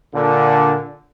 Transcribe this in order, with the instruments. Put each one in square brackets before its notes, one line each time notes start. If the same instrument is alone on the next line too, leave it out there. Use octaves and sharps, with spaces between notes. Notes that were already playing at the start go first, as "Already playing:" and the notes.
[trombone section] A#2 D3